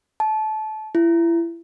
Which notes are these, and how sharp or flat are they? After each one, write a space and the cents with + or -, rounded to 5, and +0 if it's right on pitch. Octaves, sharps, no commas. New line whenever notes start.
A5 -25
E4 +30